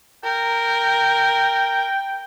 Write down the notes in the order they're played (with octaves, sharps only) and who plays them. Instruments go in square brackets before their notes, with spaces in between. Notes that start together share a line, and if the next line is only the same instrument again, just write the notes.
[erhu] A#4 [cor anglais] G5